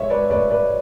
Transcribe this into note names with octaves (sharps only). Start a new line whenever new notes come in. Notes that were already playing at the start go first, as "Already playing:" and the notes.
Already playing: G#2 G#3 C#5 E5
B4 D5
A1 B4 D5
B4 D5